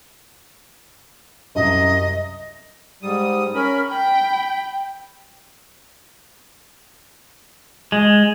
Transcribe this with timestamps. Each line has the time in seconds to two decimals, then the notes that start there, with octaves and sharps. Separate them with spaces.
1.55 C2 F#2 D#5 E5
3.02 G#2 G3 D#6
3.55 C#4 A#4 B5
3.90 G5 B5
7.92 G#3